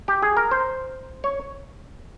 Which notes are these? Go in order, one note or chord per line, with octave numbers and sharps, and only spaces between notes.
G4
G#4
A#4
C5
C#5